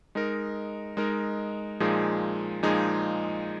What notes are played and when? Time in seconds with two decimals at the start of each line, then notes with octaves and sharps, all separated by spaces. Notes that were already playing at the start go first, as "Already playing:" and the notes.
0.15 G#3 D#4 A#4
0.97 G#3 D#4 A#4
1.80 A#2 F3 G#3 D#4 G#4
2.63 A#2 F3 G#3 D#4 G#4